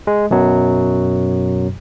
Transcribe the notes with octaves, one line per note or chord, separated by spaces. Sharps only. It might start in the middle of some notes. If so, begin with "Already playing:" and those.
G#3
F#2 B2 F#3